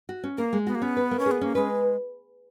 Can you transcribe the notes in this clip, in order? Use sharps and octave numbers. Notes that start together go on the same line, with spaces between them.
F#4
C#4
A#3 A#4
G#3
B3 F#4
A#3
B3 C#4
B4
A#3
C#4
G#4
B3
A#3 C#4
G#3 B4